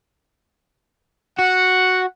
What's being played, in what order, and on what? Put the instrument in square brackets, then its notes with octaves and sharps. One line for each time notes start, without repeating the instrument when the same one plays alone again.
[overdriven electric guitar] F#4 [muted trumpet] F#5